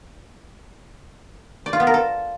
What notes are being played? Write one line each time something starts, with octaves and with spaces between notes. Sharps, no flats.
D5
F4
B3
A#4
A4